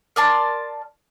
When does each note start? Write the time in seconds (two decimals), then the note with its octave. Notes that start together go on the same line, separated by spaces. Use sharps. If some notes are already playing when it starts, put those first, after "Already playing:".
0.16 A#4 D5 A5 C6